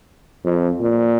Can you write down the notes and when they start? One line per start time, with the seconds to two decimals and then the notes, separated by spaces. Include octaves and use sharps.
0.44 F2
0.81 A#2